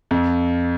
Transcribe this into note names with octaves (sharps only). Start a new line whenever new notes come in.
F2